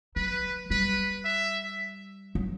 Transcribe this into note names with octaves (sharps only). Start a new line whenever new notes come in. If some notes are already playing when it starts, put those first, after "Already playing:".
F#3 B4
G3 B4
E5
F#3